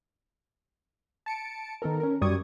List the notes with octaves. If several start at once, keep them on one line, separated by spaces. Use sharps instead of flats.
A5 C#7 D7
D#3 B3 A4 A#4
C#4 A#4
F#2 G3 D5 C#6 D#6 G#6